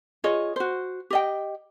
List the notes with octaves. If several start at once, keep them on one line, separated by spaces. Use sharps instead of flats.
F4 G#4 C#5 D#5
F#4 C5
G4 D#5 G5